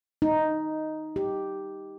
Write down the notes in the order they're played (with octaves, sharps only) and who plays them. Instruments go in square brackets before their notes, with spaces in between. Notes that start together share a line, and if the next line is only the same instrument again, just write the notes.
[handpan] D#4
G4